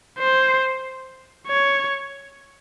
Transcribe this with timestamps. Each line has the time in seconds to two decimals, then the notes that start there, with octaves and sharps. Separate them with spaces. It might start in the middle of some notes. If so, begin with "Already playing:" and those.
0.18 C5
1.48 C#5